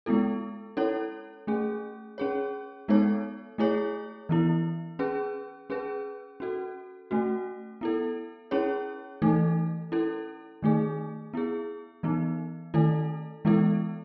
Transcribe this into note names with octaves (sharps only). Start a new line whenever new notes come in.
G#3 B3 E4 A4
C#4 E4 A4 C#5
A3 C#4 G#4
C#4 G#4 C#5
G#3 B3 D#4 A4 C#5
A3 E4 G#4 C#5
E3 B3 E4
C#4 G#4 B4
C#4 G#4 B4
C#4 F#4 A4
A3 C#4 F#4
B3 E4 A4
C#4 E4 G#4 C#5
E3 A3 D#4 A4
C#4 E4 A4
D#3 A3 D#4 G#4
B3 E4 G#4
E3 B3 D#4
D#3 A3 E4 A4
E3 G#3 B3 E4 A4